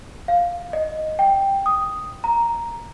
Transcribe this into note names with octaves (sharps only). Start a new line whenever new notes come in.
F5
D#5
G5
D#6
A#5